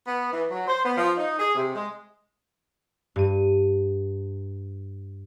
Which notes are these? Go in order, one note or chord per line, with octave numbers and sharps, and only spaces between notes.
B3
E3
F#3
C5
B3
F3
D#4
G#4
C3
G#3
G2 D#7